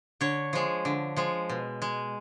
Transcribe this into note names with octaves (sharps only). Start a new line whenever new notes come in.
D3 C#5
F3 G#3
D3
F3 G#3
B2
G#3